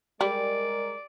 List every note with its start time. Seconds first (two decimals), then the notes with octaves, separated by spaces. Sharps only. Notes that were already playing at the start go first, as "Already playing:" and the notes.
0.21 G3 G#3 A#4 D5